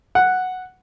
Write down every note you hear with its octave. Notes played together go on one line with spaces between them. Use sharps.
F#5